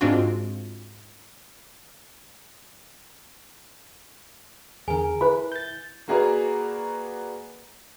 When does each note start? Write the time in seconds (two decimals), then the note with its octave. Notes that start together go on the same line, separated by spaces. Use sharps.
0.01 G#2 G#3 C4 D4 F4 F#4
4.88 E2 D3 G#4 A#4 G#5
5.21 E4 B4 B5
5.52 G6 A6
6.08 A#3 F#4 G#4 B4 D5 A#5